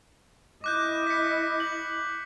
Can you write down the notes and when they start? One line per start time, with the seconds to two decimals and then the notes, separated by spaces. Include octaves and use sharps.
0.64 E4 D#5 D6 F#6 G6
1.07 B6 C#7
1.60 F#7